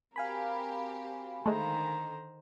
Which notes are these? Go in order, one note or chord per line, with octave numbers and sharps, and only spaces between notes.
C4 F#4 G4 A#4 F5 G#5 B5
D3 D#3 G#3 A3 C5 A#5